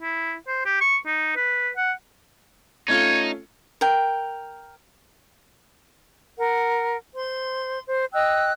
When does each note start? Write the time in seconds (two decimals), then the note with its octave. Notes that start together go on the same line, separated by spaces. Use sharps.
0.01 E4
0.48 C5
0.66 G4
0.81 C#6
1.06 D#4
1.36 B4
1.77 F#5
2.88 A3 C#4 D#4 F4 C#5
3.81 A#4 G5
6.38 A#4 F#5
7.14 C5 C6
7.87 C5
8.13 D#5 G5 E6 F#6